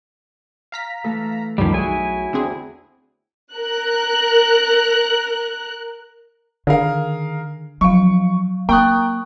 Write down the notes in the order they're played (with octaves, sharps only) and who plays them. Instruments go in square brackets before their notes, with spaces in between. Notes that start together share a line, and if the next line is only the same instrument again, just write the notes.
[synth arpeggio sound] F5 A#5 B6
[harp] E3 A3 A4
[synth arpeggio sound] C#2 F#2 D#3 [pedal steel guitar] F3 G3
[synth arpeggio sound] B1 [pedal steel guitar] E4 G#5 [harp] F#4 G#4 C#5
[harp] E2 [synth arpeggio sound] D3 C4 G#4
[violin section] A#4 F#6
[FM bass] D3 [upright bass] D#3 [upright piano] G#4 A#4 F5
[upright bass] F3 [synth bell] F#3 F5 [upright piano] C#6
[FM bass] A#3 [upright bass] C4 [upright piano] G5 F#6 [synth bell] A#5 C#6 D#6